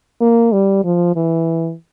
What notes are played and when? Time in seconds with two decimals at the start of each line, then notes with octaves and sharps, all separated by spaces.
0.21 A#3
0.53 G3
0.85 F3
1.16 E3